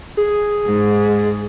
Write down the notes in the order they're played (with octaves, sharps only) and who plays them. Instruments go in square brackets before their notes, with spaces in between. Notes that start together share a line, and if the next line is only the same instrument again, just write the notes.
[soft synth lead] G#4
[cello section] G#2